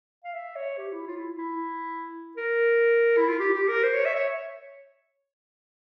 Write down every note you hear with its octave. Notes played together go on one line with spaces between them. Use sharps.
F5
E5
C#5
G4
E4
F4
E4
E4
A#4
E4
F4
G4
G4
A#4
C5
C#5
E5
C#5